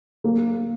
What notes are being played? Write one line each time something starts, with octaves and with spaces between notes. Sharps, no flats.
A#3